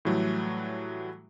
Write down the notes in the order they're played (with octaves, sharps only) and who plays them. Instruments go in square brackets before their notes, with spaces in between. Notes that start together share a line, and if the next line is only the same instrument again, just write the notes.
[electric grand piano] A2 E3 F#3 G3 A3